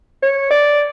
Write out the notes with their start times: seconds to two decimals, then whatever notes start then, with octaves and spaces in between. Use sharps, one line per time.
0.22 C#5
0.51 D5